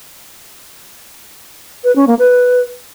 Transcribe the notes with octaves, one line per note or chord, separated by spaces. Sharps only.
B4
C#4
A#3
B4